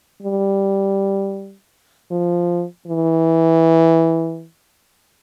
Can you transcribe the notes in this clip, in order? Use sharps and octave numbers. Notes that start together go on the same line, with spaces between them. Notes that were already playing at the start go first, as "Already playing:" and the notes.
G3
F3
E3